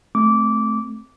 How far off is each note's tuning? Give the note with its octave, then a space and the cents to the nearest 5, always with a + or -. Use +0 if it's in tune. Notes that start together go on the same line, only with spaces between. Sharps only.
A3 -15 C4 +0 D6 -15